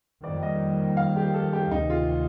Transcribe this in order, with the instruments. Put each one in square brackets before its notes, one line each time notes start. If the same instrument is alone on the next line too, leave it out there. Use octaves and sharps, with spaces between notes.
[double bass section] F2 D#3 G3 A#3 [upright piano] D5
[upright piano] D#5
F5
G4
A4
G4
[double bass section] D2 C3 D#3 [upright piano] D#4
[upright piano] F4